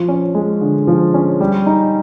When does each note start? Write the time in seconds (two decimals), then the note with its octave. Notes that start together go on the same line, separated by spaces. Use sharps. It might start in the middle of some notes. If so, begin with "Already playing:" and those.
Already playing: F3
0.08 C#4
0.35 G#3
0.61 D3
0.87 F3
1.14 C#4
1.40 G3
1.66 D#4